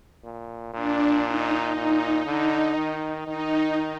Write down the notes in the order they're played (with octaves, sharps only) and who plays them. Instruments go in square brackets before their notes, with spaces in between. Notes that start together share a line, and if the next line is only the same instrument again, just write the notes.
[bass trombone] A#2
[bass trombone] A#2 [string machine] D4
[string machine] D#4
[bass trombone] A#2 [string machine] D#4
[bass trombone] D3 [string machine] D#4
[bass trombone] D#3
[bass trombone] D#3 [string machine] D#4